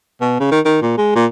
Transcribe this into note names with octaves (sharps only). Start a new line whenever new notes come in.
B2
C#3
D#3
D#3
A#2
G#3
A#2